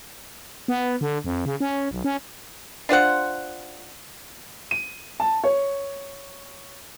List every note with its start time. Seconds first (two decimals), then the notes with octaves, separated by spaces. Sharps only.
0.68 B3
1.01 D3
1.24 F2
1.46 C#3
1.60 C#4
1.91 B1
2.04 C#4
2.89 D4 F4 C5 F#5
4.71 D#7
5.20 A5
5.44 C#5